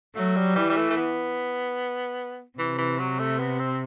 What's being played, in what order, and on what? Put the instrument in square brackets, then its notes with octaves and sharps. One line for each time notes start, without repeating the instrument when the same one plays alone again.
[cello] F#3 [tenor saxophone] A3
[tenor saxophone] G3
[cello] E3 [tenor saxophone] G3
[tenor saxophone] G3
A3
A3
B3
[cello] C3 [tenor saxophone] E3
[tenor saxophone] E3
F#3
A3
B3
C4